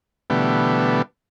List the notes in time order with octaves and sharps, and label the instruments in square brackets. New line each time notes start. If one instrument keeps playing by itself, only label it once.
[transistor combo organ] B2 D3 E3 G3 A3 B3